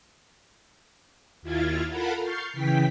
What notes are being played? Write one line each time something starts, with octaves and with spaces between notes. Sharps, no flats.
D#2 E4 F4 F6 G#6 A6
F4 A4 A#4 F#5 B5
C#6 F6 G6 A6 C7
C#3 E3 G5 B6